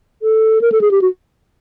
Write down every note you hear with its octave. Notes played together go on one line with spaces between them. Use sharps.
A4
A#4
A4
G#4
G4
F#4